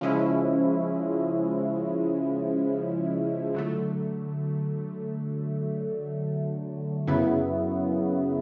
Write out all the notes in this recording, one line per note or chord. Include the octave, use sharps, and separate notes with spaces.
C#3 F3 G#3 C#4 E4
D3 F#3 A3
F#2 C#3 F#3 B3 E4